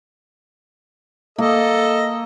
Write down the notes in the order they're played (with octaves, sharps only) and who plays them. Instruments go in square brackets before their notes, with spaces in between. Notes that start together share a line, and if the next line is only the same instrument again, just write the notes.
[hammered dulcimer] A#3 [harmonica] A4 D#5